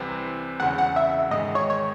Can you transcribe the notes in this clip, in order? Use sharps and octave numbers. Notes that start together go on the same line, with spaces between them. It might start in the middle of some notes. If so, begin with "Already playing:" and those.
Already playing: C2 C3 E3 C4
E1 E2 C#3 F#5
F#5
E5
G#2 D#3 G#3 D#5
C#5
C#5